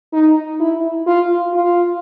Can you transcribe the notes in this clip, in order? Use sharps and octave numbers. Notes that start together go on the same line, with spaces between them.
D#4
E4
F4
F4